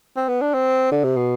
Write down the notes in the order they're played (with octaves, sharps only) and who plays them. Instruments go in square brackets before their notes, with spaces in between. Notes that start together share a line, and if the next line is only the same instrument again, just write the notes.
[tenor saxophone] C4
B3
D4
C4
D3
C3
B2